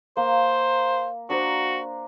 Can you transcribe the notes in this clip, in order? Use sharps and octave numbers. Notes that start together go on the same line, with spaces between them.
A#3 C5
D4 F#4 A#4 C5